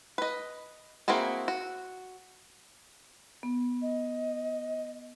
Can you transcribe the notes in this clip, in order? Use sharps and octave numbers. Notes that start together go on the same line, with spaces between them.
B4 D#5
A#3 C4 E4 F#4 G#4
F#4
B3
D#5